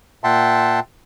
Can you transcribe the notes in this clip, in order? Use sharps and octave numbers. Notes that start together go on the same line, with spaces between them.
A#2 E5 F#5 G5 A5 C6